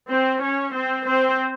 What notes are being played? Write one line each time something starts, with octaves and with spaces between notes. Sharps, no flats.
C4 C5
C#4 C#5
C4 C5
C4 C5